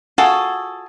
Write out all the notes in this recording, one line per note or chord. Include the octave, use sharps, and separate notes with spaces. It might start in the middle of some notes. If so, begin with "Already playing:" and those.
F4 F#4 G#4 A4